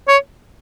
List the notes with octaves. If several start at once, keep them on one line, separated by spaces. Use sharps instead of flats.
C#5